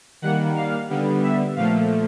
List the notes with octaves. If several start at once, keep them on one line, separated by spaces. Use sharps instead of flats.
D#3 G3 A#3 F#5
F5
D3 G3 B3
E5
A#2 F3 A3 F5